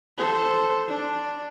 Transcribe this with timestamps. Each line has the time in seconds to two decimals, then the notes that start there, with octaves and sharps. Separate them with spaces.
0.18 A4 C5
0.88 D4